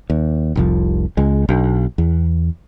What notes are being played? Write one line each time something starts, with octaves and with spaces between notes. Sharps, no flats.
D#2
F1 C2 F3
C#2 G#3
B1 D4
E2